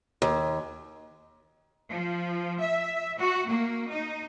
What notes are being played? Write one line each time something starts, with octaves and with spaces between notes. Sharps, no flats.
D#2
F3
E5
F#4
A#3
D#4